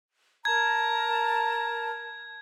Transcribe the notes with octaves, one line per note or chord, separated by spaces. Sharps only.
A#4 A5 A#5 G#6